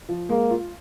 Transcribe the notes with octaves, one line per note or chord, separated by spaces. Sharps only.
F3
G#3 A#3
F4